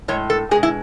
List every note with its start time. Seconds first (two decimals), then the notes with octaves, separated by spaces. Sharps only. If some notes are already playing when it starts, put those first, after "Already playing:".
0.08 A2 G#3 C#5
0.30 A4
0.51 G#3 G#4
0.55 B2
0.63 E4